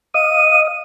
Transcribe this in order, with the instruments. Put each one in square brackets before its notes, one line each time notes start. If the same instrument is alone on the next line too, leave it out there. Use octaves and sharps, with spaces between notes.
[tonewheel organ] D#5 F5 D#6 [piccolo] D#7